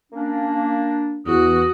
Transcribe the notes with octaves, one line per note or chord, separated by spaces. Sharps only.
A#3 C#4 D4
E2 F#4 D#6